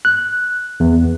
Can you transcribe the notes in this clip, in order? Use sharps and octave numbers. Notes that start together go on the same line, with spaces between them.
F#6
E2